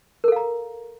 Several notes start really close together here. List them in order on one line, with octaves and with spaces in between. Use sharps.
A#4 A4 F5 A#5